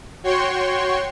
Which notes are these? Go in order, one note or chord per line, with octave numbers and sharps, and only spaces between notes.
F#4 C#5 G5 C6 C#6